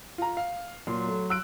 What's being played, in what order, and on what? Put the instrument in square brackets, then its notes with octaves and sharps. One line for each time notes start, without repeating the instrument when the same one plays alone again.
[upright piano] F4 A#5
F5
[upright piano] A#2 [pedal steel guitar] F#3 C6
[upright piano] A3
E6 F#6 D7